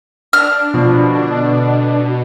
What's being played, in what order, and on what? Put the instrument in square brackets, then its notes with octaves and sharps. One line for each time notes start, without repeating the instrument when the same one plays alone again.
[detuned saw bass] D4 [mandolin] F6
[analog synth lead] B2 [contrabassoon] F3
[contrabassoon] D3